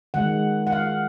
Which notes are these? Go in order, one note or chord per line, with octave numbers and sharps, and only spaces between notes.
D#3 G#3 F#5
F#5
F5